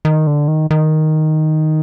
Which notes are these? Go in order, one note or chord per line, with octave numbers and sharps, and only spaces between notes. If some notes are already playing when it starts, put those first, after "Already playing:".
D#3
D3
D#3
D#3